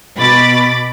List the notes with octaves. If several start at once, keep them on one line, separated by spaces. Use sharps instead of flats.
B2 B5 D6 A6